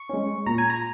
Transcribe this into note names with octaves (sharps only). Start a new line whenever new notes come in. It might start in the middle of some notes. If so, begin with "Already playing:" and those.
Already playing: C#6
G#3 C#4
A#2 A#5
G#5
A#5